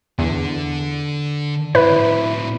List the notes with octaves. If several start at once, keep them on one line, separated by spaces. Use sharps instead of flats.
E2 D3
A2 C4 E4 B4